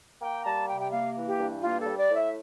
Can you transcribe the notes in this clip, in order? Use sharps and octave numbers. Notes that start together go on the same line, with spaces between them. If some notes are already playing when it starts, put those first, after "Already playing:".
A#3 G5
A#5
G3 A5
C3 G5
G5
A#3 F5
E3
G4
G2
A#3 F4
A4
G3
D5
A2
E5